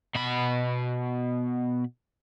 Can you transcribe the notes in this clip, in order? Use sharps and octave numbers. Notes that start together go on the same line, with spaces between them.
B2 B5